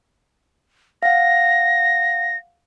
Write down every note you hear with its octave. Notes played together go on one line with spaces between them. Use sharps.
F5 F#5 A#6